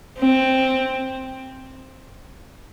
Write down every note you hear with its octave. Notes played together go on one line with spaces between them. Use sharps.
C4